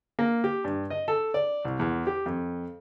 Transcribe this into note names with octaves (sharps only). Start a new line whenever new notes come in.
A#3
G4
G2
D#5
A4
D5
C2
E2
G4
F2